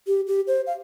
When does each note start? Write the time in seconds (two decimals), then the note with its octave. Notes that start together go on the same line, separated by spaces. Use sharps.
0.07 G4
0.27 G4
0.47 C5
0.67 F5